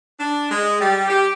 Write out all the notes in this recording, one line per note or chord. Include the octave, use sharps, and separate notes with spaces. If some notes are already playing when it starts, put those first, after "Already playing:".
D4
G#3
G3
G4